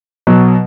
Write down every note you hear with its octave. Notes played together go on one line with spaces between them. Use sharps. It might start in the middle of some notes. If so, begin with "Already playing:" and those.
B2 F#3